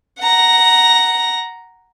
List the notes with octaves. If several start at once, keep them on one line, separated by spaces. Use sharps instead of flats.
F#5 A#5